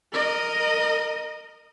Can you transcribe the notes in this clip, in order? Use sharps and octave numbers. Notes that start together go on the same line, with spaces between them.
A#4 D#5